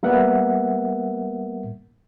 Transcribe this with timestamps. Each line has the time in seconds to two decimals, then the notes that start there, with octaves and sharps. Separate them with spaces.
0.03 G3 A#3 B3 A#4 E5 F#5